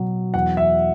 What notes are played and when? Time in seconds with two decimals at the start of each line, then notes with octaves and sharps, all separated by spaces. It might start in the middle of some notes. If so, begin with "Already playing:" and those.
Already playing: B2 F#3
0.34 E2 F#5
0.57 E5